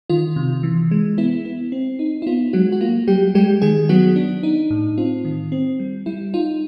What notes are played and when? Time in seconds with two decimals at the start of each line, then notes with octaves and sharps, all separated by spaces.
0.10 D#3 F4
0.36 C3
0.63 E3
0.91 G#3
1.18 B3 E4
1.45 B3
1.72 C4
1.99 D#4
2.22 E4
2.27 B3 F4
2.53 F#3 G#3 F#4
2.72 F#4
2.81 A#3 F4
3.08 F#3 G3 G4
3.35 G3 G#3 G4
3.62 D#3 G#3 G#4
3.89 F#3 B3 F#4
4.16 D4
4.43 D#4
4.70 A2
4.98 C4 F4
5.25 D#3
5.52 C4
5.80 G3
6.06 G3 E4
6.34 D#4 F4